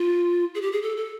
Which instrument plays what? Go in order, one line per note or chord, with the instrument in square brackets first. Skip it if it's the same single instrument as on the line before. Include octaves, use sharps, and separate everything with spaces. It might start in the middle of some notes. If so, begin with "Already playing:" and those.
Already playing: [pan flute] F4
G#4
G4
G#4
A4
A4